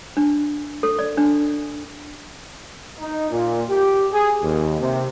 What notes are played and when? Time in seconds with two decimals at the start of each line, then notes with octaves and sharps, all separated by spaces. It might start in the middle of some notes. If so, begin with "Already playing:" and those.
0.17 D4
0.83 A4
0.99 D5
1.17 D4
2.99 D#4
3.31 A#2
3.69 G4
4.12 G#4
4.43 D#2
4.80 C3